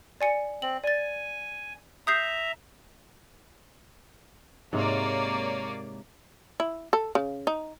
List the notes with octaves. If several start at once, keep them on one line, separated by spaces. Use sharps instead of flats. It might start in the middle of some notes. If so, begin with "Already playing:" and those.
D5 G#5 C#7
C4 F#7
D5 G#5 A6
E5 A#5 D#6 G6 C7
G#2 C3 A#3 C#5 D5
E4
A4
C#3
D#4